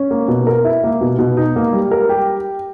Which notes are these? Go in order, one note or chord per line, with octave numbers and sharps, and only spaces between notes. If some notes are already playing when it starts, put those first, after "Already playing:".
Already playing: C#4
A#3
B2
A#4
E4
A#3
B2
B2
D#4
A#3
G3
A#4
G4